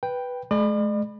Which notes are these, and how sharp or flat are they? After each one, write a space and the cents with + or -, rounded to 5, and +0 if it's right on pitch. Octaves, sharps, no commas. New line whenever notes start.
B4 -5 G5 +0
G#3 +45 D5 +45 B5 +0